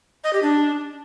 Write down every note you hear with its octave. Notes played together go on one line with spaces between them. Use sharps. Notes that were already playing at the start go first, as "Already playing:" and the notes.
D#5
G4
D4